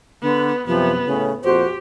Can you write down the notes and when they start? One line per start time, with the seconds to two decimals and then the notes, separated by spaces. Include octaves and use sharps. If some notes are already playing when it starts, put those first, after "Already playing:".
0.22 D3 B3
0.67 F#2 C3 F3 B3
1.06 A2 C#3
1.44 F2 A#2 F#4 G4 C5